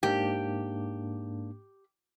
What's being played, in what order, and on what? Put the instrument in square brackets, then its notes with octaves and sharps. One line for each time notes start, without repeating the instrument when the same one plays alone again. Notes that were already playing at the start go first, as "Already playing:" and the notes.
[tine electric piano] G#2 A#3 D4 [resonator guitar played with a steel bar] G4